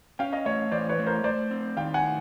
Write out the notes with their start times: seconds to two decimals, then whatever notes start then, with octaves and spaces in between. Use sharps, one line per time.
0.19 C#4 F5 G5
0.32 D#5 F5
0.45 A3 C#5 D#5
0.71 E3 C5 D5
0.89 B4 C#5
0.99 A3
1.07 A#4 C5
1.24 A3 C5 D5
1.51 C4
1.77 D#3 F5 G5
1.94 F#5 G#5
2.04 A3